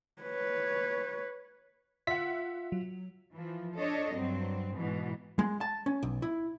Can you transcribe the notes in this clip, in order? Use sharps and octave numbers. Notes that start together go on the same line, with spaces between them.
B4 C#5
F4 E5 F#5 B6
F#3
E3 F3
D4 A4 C#5 D#5
G2 F#3 C4
G#2 B2 E3
G#3
A5
C#4
B1
E4